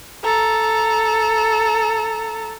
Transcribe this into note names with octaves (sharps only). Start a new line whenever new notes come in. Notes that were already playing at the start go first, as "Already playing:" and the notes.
A4 A#5